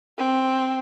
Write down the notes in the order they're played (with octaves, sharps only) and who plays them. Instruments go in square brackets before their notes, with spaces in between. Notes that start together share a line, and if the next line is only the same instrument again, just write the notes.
[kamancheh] C4